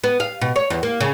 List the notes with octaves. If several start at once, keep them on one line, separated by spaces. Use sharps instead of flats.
B3
F5
B2
C#5
E2
A#3
C#3